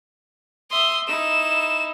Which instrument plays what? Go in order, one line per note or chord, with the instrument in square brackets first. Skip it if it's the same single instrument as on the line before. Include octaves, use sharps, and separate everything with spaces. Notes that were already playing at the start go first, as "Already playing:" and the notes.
[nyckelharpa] E5 [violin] C6 D#6
[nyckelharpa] D#4 E4 [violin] E7